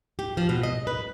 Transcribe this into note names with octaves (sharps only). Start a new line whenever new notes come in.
G4
F3
B2
D#5
B4